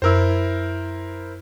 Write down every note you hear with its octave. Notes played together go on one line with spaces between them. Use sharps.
F#2 E4 A#4 C5 E6